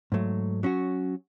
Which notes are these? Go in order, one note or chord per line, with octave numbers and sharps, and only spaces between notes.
G#2 F#3 A3
F#3 C#4 F#4